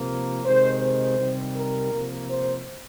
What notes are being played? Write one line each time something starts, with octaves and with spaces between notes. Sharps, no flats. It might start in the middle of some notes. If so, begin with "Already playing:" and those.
Already playing: C3 F3 A#3
C3 D#3 G#3 C5
C5
C3 D#3 G3
A#4
C3 F3 A#3
C5